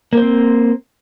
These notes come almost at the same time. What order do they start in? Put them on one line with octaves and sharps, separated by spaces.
A#3 C5 C4